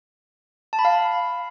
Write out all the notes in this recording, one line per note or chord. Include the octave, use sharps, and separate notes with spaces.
A5
B5
F5